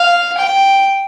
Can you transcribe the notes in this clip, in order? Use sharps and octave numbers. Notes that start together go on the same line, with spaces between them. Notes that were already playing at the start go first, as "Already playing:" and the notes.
Already playing: F5
G5